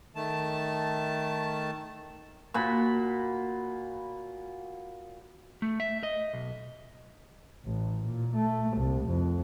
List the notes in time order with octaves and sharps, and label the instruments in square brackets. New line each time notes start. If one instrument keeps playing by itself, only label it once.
[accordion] D#3 A3 A5
[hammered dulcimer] A#2 F#4 B5
[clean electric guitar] A3
E5
D#5
B1
[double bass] A1
A#2
A3
C2
F2